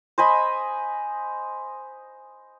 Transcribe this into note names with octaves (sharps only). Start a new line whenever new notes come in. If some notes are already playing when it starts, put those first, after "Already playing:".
C5 D#5 G#5 B5